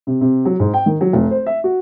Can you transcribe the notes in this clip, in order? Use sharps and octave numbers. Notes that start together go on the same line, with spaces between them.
C3
C3
F#3
G#2
G5
D#3
F#3
F1
C5
E5
F#4